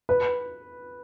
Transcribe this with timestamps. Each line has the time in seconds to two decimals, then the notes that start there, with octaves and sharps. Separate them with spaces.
0.09 B4